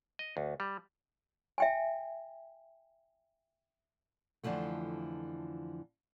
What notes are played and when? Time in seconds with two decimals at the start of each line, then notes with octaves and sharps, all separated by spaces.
0.19 D#5
0.37 D2
0.60 G3
1.58 E5 G5 G#5
4.43 F2 D3 E3 F3 A3